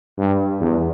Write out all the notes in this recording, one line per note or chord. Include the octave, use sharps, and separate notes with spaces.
G2
E2